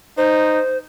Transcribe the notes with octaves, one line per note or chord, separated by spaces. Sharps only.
D#4 C5